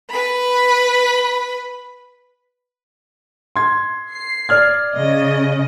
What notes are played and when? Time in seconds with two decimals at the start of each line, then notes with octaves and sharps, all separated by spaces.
0.10 B4 B5
3.56 C6 G#6
4.10 C7
4.49 D5 F6 G#6
4.95 C#3 D#5